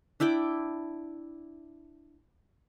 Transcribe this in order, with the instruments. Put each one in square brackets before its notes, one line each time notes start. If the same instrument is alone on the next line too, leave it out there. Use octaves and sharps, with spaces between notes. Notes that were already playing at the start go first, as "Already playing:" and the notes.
[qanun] D4 E4 G5 D6